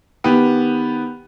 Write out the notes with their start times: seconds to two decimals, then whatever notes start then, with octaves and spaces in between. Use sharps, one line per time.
0.24 D#3 B3 G4